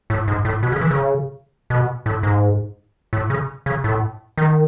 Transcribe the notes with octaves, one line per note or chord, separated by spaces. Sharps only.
A2
G#2
A2
B2
C#3
E3
C#3
B2
A2
G#2
A2
C#3
C#3
A2
D#3